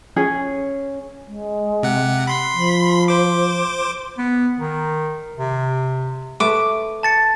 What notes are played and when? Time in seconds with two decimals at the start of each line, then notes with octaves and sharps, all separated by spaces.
0.16 C#4 G#4
1.27 G#3
1.83 C3 F#5
2.27 B5 C6 B6
2.54 F3
3.08 C5 D6
4.18 B3
4.59 D#3
5.38 C3
6.40 A3 B4 D6
7.03 A5 A6 C#7